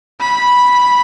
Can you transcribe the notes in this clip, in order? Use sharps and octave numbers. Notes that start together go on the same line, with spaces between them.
B5